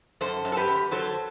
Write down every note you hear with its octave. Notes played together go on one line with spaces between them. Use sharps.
F#2 A4 C5
F#2
A4
G4 B4
F#2
F#3 A4 C5